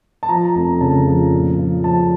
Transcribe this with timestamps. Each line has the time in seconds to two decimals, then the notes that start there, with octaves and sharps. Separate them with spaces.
0.23 A5
0.29 F3 A#5
0.55 F1 A#5
0.81 C#3 A5
1.06 F3
1.33 A#2
1.58 F3
1.84 F3 A5